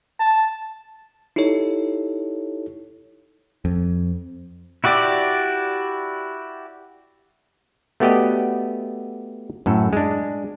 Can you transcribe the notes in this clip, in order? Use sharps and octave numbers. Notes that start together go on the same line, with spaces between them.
A5
D#4 E4 G4 A4 C#5
F2
E4 F#4 G4 D5
A3 B3 F#4 G4 D5 D#5
F#2 A2 A4
G#3 D4